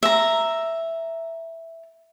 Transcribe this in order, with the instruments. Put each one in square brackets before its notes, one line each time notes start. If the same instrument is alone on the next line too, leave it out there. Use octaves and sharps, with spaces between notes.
[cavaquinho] E5 A#5